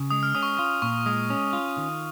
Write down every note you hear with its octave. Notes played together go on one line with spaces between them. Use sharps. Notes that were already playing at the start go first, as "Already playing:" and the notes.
Already playing: C#3
G#3 D#6
F6
C#4 D#6
C#6
F4 C#6
A#2 C#6
G#3 D#6
C#4
F4
D#3